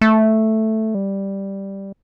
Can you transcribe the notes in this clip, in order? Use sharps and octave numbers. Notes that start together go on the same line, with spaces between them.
A3
G3